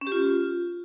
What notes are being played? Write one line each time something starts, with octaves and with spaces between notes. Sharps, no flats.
C#4
G4
F4